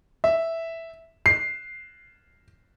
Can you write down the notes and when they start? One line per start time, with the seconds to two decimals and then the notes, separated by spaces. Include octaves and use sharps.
0.24 E5
1.26 C7